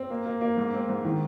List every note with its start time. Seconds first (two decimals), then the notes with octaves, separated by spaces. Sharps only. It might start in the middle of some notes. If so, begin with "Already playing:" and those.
Already playing: C4
0.10 A#3
0.26 A#3
0.41 A#3
0.57 G#2
0.73 C4
0.89 G#2
1.05 D#3